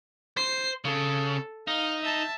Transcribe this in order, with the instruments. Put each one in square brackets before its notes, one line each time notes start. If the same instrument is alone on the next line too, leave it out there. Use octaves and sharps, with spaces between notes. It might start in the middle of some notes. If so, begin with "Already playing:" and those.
[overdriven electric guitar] C5 [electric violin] C7
[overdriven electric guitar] C#3 [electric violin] A4
[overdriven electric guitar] D#4 [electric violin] F5
[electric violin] E5 A5